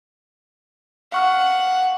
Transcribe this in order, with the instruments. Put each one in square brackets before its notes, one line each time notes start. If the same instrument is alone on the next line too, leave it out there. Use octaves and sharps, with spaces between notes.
[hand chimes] F5 C#6 F6 [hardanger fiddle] F#5